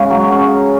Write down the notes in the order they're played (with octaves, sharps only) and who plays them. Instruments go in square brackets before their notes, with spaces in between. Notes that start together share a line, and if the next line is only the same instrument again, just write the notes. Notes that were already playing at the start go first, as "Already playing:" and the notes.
Already playing: [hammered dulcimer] C#3 C#4 [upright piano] G#3
[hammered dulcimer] F#3
C#4